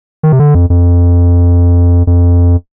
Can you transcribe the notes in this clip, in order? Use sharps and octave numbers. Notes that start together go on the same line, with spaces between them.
D#3
C3
D3
F2
F2
F2